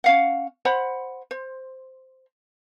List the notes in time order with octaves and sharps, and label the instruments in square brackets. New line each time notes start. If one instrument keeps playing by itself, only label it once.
[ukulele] C#4 F5 F#5
C5 F#5 B5
C5